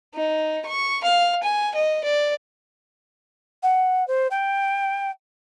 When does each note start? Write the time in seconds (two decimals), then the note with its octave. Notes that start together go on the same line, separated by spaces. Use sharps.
0.14 D#4
0.66 C#6
1.04 F5
1.43 G#5
1.75 D#5
2.04 D5
3.62 F#5
4.07 C5
4.30 G5